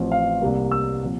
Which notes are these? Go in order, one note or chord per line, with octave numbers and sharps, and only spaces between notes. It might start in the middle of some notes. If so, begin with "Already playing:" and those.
Already playing: A1 A2 F3 C4
F5
C2 C3 G3 A#3
E6
A#2 F3 C4